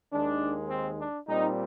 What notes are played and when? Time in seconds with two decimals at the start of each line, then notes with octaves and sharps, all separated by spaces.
0.12 D#2 D#3 G#3 D4
0.70 C4
0.98 D4
1.28 A#2 G3 C4 D#4